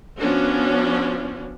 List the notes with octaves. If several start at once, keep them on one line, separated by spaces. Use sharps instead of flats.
F3 B3 C#4 D4 F#4